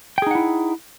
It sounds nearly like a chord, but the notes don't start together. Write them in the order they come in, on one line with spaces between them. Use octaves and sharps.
G5 G#4 D#4 F#5 E4